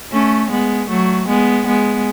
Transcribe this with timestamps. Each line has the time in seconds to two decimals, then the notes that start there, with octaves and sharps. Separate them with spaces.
0.12 A3 C#4
0.51 G#3 B3
0.89 F#3 A3
1.28 G#3 B3
1.67 G#3 B3